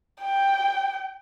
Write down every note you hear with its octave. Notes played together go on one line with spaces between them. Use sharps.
G5